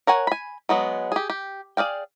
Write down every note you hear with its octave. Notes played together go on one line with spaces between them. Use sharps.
A#4 C#5 F#5 G#5
G#5 B5
F#3 G#3 B3
G4 G#4
G4
G#4 D5 F5 G5